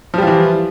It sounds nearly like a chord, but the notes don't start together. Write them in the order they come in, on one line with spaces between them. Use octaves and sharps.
F3 G3 F4 E3